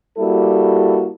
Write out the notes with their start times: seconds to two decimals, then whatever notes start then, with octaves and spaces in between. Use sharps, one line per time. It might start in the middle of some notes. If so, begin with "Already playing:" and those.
0.18 G3 A#3 E4 F#4 A4